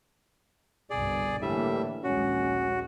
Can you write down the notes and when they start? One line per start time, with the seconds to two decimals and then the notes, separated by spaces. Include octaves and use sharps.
0.90 G1 C2 B2 G#4 D5
1.42 A2 D3 E3 G3 A#3 E5
2.04 A#1 D#2 G#3 C#4 F#4